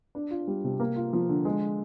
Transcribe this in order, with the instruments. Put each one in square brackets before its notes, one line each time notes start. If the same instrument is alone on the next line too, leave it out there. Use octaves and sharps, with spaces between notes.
[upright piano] D4
F4
G3
C3
A#3
F4
F3
D3
G#3